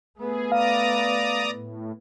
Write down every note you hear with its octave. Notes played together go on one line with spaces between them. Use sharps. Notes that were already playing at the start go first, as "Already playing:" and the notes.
A3 B3 G#4
D5 F5 A#5 D#6
A2